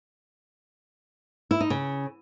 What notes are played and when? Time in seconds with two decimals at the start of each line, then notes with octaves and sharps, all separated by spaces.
1.51 E4
1.61 D#4
1.70 C#3